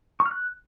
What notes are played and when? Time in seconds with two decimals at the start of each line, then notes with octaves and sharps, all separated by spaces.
0.20 C#6
0.26 F6
0.31 F#6